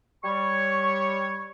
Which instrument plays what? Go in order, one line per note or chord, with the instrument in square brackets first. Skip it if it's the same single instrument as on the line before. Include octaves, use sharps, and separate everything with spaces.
[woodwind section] G3 C#5 C#6